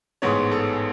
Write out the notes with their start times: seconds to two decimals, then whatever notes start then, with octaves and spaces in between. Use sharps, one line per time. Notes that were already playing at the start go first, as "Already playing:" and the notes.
0.22 A1 G#2 G#3 B3 C#5
0.52 A4